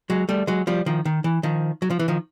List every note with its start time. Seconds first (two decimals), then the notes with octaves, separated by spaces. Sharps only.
0.10 F#3 G#3
0.29 G3 A3
0.47 F#3 G#3
0.67 F3 G3
0.86 D#3 F3
1.05 D#3
1.24 E3
1.43 D#3 F3
1.82 F#3
1.90 F3
1.99 E3
2.08 D#3 F3